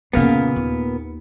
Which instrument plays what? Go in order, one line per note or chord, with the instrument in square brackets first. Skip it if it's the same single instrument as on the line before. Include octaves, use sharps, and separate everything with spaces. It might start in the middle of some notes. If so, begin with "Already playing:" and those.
[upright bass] F2 C#3 [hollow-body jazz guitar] A#2 A#3 B3
[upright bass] D#2